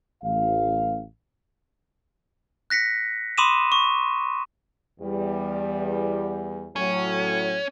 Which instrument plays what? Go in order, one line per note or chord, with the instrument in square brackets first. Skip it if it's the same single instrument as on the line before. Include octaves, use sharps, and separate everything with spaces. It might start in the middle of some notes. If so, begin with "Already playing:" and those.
[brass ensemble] A1 F5
[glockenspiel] F#6 A#6 B6 C#7
B5 C6 D6 D#6 D#7 E7
C#6
[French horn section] E2 G3
[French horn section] A2 F#3 [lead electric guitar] C#4